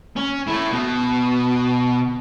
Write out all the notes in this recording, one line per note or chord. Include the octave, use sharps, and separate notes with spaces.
C#4
A3 E4
B2